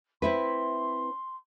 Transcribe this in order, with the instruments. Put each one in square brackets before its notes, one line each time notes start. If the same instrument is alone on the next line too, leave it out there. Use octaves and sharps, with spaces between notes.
[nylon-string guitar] C4 E4 B4 [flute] C6